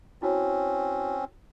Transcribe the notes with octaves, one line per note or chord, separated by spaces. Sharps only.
C4 C#4 E4 F#4 C#5